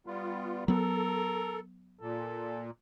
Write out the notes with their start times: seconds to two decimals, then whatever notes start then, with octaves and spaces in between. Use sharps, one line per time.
0.07 G3 B3 F4
0.68 F#3 B3 A4 A#4
2.01 A#2 A4